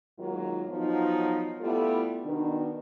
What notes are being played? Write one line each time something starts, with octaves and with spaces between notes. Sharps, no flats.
G#2 D#3 F#3 A#3 F4
F3 F#3 B3 D#4 F4
G3 A3 B3 E4 F4 A4
B2 D#3 D4